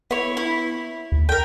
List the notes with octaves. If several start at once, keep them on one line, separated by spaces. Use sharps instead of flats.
B3 E4 C#5
E4
D#2
A#4 G5